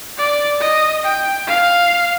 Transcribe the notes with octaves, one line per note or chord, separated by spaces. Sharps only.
D5
D#5
G5
F5